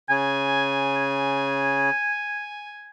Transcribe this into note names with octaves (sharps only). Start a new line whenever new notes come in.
C#3 G#5